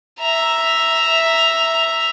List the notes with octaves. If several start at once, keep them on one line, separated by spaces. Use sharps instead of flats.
E5 A#5